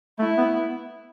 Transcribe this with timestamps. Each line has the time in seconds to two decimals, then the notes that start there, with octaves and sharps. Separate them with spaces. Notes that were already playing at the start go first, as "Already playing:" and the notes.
0.19 A3 E4
0.38 B3